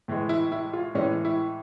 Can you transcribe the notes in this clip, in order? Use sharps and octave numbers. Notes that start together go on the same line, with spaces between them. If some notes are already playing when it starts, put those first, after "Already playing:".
A2 E3 G#3
E4
E4
F4
A2 E3 G#3 C#4
E4